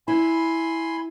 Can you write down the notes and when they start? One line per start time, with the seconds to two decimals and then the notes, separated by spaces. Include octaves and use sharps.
0.08 E4 G#5 B5 C6